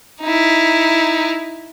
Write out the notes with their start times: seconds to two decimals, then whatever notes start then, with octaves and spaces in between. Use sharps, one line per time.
0.21 D#4 E4